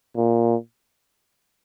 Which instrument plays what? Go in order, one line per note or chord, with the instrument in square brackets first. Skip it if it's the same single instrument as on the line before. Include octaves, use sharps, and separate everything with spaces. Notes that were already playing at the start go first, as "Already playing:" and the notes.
[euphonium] A#2